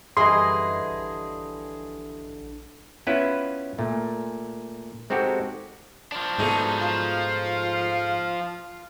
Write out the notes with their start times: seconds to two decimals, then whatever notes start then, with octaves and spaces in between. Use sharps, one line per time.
0.17 F#2 D3 E3 G3 G#4 D#5 C6
0.91 A#1
3.07 B3 C#4 E4 F4 B4
3.78 A#2 A3
5.10 G#3 C4 D#4 F#4 G4 A4
6.12 F3 D4
6.38 G#2 B2 A3 D#4 G#4
6.79 F3 F4